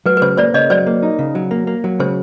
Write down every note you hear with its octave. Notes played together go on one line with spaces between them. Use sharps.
F#3 B4
B4
C#3 C5
A#3 C5 D5
C#3 C#5 D#5
F#3 C5 D5
A#3
D#4
C#3
F#3
A#3
A#3
F#3
C#3 C5